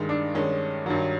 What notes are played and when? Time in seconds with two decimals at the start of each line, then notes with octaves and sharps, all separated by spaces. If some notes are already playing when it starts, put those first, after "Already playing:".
Already playing: G2 D#3 G#3
0.09 D4
0.35 G2 D#3 G#3 C#4
0.86 G2 D#3 F#3